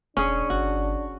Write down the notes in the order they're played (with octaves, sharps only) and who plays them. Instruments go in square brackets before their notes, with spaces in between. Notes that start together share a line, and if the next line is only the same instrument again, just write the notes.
[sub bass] E1 [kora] C#4 G#4 [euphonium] D4 [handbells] C#6
[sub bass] G1 [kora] F#4